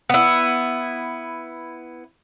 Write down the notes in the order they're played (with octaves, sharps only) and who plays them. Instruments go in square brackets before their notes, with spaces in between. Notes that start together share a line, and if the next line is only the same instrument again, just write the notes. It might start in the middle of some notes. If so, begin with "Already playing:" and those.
[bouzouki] B3 E4